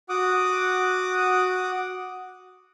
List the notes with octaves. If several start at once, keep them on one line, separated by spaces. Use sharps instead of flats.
F#4 F#5 D6 D#6